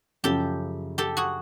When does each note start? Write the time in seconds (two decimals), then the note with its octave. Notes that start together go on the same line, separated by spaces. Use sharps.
0.24 F#2 C#3 F3 G4 A4
0.98 G4 A4
1.17 F#4 G#4